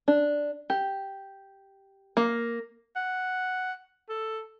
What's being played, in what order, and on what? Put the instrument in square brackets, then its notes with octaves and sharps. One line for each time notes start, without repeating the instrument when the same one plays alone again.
[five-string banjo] D4
G4
A#3
[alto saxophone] F#5
A4